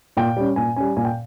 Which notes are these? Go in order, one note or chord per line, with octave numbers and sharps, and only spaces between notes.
A#2 G5
G3 C#4
A#2 G#5
G3 C#4 G#5
A#2 G#5
G5